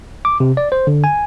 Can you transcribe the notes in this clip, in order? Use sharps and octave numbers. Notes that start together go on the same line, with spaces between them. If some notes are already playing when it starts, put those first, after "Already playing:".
D6
C3
D5
C5
D3
G#5